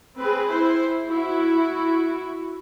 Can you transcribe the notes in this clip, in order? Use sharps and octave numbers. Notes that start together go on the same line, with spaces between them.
C4 G#4 B4
E4 C5
E4 F#4